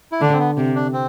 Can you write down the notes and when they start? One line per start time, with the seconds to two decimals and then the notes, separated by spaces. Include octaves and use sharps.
0.12 E4
0.21 D3 D4
0.33 C4
0.39 B3
0.57 C3
0.75 D4
0.93 C4